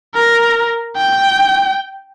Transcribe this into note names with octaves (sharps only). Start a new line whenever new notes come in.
A#4
G5